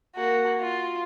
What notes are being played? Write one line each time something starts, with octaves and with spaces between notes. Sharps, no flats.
A#3 F#4
F4